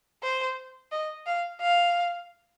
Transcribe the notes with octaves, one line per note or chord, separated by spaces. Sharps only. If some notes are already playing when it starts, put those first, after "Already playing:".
C5
D#5
F5
F5